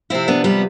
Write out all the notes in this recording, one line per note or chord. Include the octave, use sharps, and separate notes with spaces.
C3 F3 C4 E4
B3 D4
G3 B3